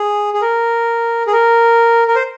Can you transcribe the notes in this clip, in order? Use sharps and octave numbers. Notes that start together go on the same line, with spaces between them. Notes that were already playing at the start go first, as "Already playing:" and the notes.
Already playing: G#4
G#4
A#4
G#4
A#4
A#4
C5